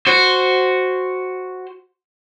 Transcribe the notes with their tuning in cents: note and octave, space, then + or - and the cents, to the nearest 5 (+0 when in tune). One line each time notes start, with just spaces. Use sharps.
F#4 +0 C5 +0